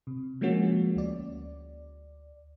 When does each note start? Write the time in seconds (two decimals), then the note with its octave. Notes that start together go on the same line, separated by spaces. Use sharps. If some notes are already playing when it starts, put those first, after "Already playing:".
0.07 C3
0.41 F3 G#3 A#3 C#4 F#4
0.96 D2 D5